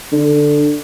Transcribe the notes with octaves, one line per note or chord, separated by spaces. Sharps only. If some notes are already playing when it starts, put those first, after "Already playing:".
D3